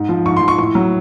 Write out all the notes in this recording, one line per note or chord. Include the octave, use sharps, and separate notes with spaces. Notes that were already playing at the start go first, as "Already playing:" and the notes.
Already playing: G#2
F3
G#2 C#6
C6
F3
C#6
A2 C#6
F#3